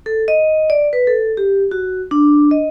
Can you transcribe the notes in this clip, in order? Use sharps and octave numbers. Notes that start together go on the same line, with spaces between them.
A4
D#5
D5
B4
A4
G4
F#4
D4
D#5